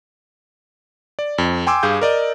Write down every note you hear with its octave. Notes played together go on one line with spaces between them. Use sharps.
D5
F2
G5 G#5 C6 D6 E6
G2 G#4 F5 G6
A#4 D5 D#5